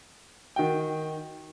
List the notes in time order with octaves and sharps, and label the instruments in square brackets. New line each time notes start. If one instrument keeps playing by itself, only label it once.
[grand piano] D#3 F#4 G5